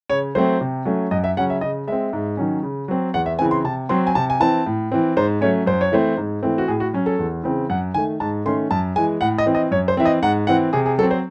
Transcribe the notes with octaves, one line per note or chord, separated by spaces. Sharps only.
C#3 C#5
F#3 A3 C4 C5
C3
F#3 A3 C#4
F#2 D#5
E5
C#3 F#3 C#4 F#5
E5
C#3 D#5
G#3 C4 E5
G#2
D#3 F#3 C#4
C#3
F#3 C4
E2 F#5
E5
C#3 E3 C4 G#5
C6
C3 A5
F#3 C4 C6
G#5
C3 A5
G#5
E3 C4 A5
A2
E3 C4
G#2 C5
F#3 A3 C#4 C#5
F#2 C5
C#5
E3 A3 C4 C5
G#2
E3 A3 C4
F#4
A2 G#4
F#4
F#3 C#4
A4
E2
C#3 E3 C4
F#2 F#5
D#3 A3 G#5
G#2 A5
D#3 A3 C#4 C6
F#2 A5
E3 G#3 G#5
A2 F#5
D#5
E3 C4
D#5
F#2 C#5
C5
E3 C4 E5
D#5
G#2 F#5
E3 C4 F#5
C3 G#4
G#4
F#3 C4 A4
C5